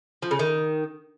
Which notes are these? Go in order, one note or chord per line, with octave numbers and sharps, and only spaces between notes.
F3
C#3
D#3